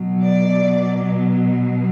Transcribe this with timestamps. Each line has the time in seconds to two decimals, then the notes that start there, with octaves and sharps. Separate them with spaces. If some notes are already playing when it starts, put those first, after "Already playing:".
Already playing: B2 F#3
0.24 D5